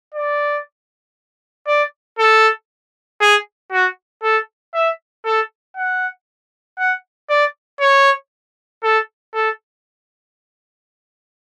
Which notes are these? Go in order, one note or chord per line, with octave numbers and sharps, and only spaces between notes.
D5
D5
A4
G#4
F#4
A4
E5
A4
F#5
F#5
D5
C#5
A4
A4